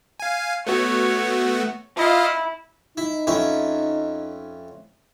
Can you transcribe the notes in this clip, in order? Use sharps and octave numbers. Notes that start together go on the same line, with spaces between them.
F5 G#5
A3 B3 F#4 C#5
E4 F4 D#5 F5
D#4 E4
F2 C#4 E4